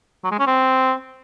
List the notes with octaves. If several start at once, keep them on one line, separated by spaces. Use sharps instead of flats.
F#3
G#3
C#4
C4